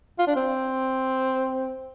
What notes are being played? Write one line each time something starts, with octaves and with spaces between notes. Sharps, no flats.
F4
D4
C4